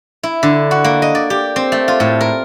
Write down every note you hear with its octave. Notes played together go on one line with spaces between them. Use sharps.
E4
D3
F#4
A#3
D#5
D5
G4
C4
A3
F4
A2
A#4